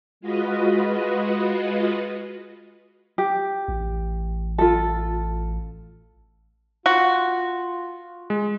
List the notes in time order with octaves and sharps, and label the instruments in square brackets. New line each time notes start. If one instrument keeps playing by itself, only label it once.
[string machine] G#3 F4 F#4 B4 D#5
[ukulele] G4
[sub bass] A1
[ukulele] F4 A4
[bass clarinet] F4 [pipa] F#4
[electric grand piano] G#3